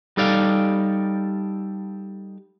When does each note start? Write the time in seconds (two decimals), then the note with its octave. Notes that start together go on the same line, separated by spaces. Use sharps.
0.17 G3 D#4 A4 D5 F5